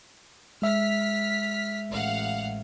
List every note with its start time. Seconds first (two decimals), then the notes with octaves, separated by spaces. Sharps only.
0.62 G#3 E5 F6 B6
1.90 A1 F5 F#5